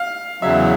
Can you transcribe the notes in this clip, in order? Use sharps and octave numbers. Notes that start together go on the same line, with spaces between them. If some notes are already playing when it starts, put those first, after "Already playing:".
Already playing: F5
E2 C#3 F#3 E5